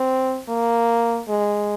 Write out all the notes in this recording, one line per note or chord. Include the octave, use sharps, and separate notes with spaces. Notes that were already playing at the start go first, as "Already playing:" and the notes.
Already playing: C4
A#3
G#3